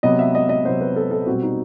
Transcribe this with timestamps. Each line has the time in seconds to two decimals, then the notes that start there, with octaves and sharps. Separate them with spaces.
0.03 C3 F#3 B3 D#5
0.19 E5
0.35 D#5
0.49 D#5
0.65 C3 F#3 B3 C5
0.81 B4
0.96 A4
1.11 A4
1.26 B2 G3 C4 F#4
1.42 D#4